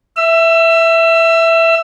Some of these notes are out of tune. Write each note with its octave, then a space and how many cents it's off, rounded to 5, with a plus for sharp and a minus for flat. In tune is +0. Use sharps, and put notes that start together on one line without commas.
E5 +0 E6 +30